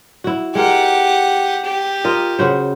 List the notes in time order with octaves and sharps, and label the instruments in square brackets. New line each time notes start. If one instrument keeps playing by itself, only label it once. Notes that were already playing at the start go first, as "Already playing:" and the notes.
[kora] E4 F#4
[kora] G#3 A#4 [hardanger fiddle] G4 F#5
[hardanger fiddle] G4
[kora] F4 A#4 D#5
C#3 F#4 C5